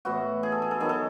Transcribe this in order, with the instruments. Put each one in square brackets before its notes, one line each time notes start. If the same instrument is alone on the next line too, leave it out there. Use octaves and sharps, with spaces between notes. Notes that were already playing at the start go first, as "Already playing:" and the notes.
[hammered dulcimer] A2 E3 B3 E4 F#4
G#4
A4
G#4
A4
D#3 F#3 B3 G#4
A4